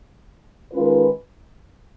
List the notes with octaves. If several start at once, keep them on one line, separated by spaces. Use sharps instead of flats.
D#3 G#3 C#4 F4 B4